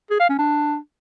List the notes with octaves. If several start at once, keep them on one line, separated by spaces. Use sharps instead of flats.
G#4
F5
C#4
D4